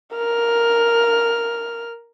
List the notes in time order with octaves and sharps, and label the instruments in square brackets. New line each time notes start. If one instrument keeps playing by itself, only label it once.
[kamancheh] A#4 F6